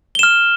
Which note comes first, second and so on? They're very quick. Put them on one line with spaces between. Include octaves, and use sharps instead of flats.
G7 E7 F6